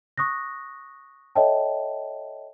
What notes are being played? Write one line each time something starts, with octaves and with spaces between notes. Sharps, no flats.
C#6 D#6 F#6 A#6
A4 C#5 D#5 E5 G5 A5